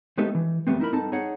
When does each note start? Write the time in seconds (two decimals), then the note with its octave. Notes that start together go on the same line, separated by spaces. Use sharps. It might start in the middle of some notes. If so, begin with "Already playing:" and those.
0.18 G#3 A3 B3 D#4 G4 A4
0.35 E3
0.67 F#2 G3 A3 B3 C4
0.80 D#4 E4 A#4 B5
0.92 G2 C4 D#4 A4 A5
1.12 D#4 G#4 C#5 F#5